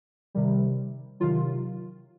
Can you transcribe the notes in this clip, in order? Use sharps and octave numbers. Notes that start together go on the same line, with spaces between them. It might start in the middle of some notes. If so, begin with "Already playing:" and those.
C3 D#3 G3
C3 D#3 F#3 F4